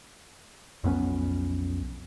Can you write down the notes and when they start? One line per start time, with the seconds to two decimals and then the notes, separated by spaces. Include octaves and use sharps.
0.84 B1 F2 B3 C#4